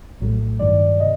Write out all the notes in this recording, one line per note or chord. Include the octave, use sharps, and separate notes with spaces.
A#1 A2 F#3 A3
G2 D#3 F#3 D5
C3 D#5